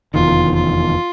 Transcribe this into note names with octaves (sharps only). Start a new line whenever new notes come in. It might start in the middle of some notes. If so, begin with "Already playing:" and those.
F1 E2 C3 D#3 F4
F4